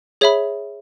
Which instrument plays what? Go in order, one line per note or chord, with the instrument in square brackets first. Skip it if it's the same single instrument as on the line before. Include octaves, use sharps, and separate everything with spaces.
[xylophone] G#4 C#5 E5 B5